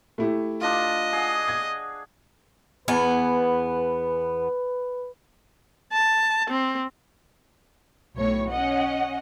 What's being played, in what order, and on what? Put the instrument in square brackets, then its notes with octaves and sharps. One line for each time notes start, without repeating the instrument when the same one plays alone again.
[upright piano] A3 E4 G4
[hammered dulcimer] D4 F4 [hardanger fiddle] D#5
[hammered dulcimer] G#4 F#5
[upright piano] G#6
[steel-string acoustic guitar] E2 B3 G#5 [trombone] B4
[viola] A5
C4
[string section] B1 A2 C#5
C#4 D#5 F#5